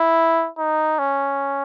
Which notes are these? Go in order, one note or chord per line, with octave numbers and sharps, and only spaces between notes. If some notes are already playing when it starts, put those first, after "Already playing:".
Already playing: E4
D#4
C#4